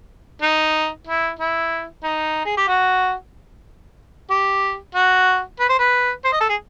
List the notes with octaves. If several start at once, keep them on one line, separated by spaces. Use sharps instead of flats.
D#4
E4
E4
D#4
G#4
G4
F#4
G4
F#4
B4
C5
B4
C5
D#5
A4
G#4